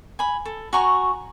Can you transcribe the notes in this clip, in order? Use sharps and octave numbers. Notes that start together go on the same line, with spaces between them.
G#5 B5
A4
F#4 G#5 A#5 C#6